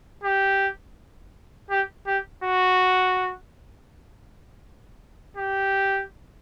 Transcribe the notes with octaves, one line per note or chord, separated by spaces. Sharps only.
G4
G4
G4
F#4
G4